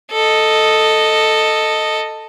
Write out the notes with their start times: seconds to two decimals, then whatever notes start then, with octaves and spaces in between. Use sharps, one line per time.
0.11 A4 D#5